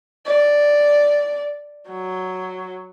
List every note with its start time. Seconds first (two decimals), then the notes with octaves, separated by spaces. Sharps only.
0.26 D5
1.89 F#3